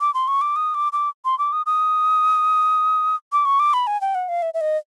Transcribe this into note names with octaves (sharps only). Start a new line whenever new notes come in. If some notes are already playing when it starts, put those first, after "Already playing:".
D6
C6
C#6
D6
D#6
D6
D6
C6
D6
D#6
D#6
D6
C#6
D6
B5
G#5
G5
F#5
F5
E5
E5
D#5